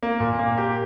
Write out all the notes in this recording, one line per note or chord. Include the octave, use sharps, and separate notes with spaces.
A#3
A#2
A#3
G4